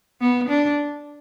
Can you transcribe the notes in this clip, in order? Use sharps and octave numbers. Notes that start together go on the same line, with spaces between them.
B3
D4